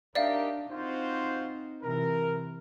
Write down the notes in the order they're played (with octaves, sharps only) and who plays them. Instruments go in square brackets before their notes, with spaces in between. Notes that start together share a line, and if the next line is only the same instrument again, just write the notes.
[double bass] D4 [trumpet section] D#4 G4 A#4 [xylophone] D5 E5 F5
[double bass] C4 D#4 [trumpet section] F4 F#4 C5
[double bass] C3 E3 [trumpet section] A#4